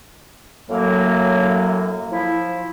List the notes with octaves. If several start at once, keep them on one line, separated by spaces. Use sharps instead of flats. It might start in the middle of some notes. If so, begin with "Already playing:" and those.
F#2 A2 F#3 A#3
F3 E4